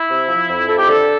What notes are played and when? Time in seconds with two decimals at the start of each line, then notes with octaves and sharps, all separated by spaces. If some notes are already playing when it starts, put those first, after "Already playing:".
Already playing: E4
0.10 C3
0.28 F3
0.48 F2
0.68 F2 A4
0.78 G4
0.88 D3 A4